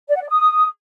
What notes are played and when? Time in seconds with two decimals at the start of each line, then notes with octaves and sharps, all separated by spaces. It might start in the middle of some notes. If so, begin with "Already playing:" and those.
0.09 D5
0.15 F#5
0.22 D5
0.28 D#6